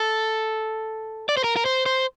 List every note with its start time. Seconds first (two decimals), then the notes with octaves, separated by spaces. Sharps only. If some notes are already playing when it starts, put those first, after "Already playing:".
Already playing: A4
1.29 D5
1.37 C5
1.44 A#4
1.56 A#4
1.66 C5
1.86 C5